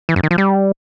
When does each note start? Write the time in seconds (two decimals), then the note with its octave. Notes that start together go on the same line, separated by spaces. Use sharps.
0.09 E3
0.16 F#2
0.23 D#3
0.31 F3
0.38 G3